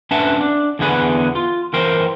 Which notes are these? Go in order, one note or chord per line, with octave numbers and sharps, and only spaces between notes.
C#4 D4 B4 E5 F#5 A5
D4
E2 D3 B3 G#4 B4 F#5
F4
E3 A#4 C5 G5